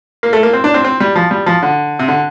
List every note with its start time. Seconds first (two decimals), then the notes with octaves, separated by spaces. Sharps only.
0.23 A#3
0.33 A3
0.43 A#3
0.53 C4
0.64 D4
0.74 C4
0.84 C4
1.00 G3
1.15 F3
1.31 G3
1.46 F3
1.63 D3
1.99 C3
2.08 D3